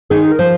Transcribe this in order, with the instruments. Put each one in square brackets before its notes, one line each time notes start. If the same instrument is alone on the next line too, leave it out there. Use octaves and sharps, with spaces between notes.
[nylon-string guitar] D#3 D#4 [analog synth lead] G#4
[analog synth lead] A#4
[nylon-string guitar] F3 F4 [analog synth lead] C5